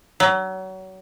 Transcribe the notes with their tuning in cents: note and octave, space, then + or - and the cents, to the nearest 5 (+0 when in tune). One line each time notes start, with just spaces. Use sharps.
F#3 +30